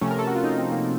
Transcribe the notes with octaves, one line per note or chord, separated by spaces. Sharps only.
C3 F3 A3 C#4
A#4
A4
F#4
F4
D#4
C4
A#3